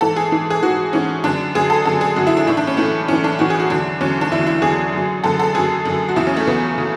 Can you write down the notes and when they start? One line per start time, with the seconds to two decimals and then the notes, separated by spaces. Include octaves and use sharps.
0.01 G#2 E3 A4
0.16 G#4
0.32 G#2 E3
0.50 G#4
0.62 G#2 E3 F#4
0.93 G#2 E3 C#4
1.24 F#2 D3 F#3 D4
1.55 F#2 D3 F#3 G#4
1.70 A4
1.86 F#2 D3 F#3 A4
2.01 G#4
2.16 F#2 D3 F#3 F#4
2.27 E4
2.37 D4
2.47 A2 E3 E4
2.57 D4
2.67 C#4
2.77 A2 E3 A3
3.08 A2 E3 C#4
3.24 D4
3.39 A2 E3 F#4
3.50 G#4
3.60 F#4
3.70 E2 D3 F#3 D4
4.00 E2 D3 F#3 C#4
4.21 D4
4.31 E2 D3 F#3 E4
4.46 E4
4.62 E2 D3 F#3 G#4
4.93 F#2 D3 F#3
5.24 F#2 D3 F#3 A4
5.40 A4
5.55 F#2 D3 F#3 G#4
5.85 F#2 D3 F#3
6.09 F#4
6.16 E2 C#3 F#3 E4
6.27 C#4
6.37 A3
6.47 E2 C#3 F#3 B3
6.78 C#3 F#3